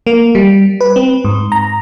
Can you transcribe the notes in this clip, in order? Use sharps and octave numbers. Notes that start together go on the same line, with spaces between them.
A#3
G3
B4
C4
G#2
A#5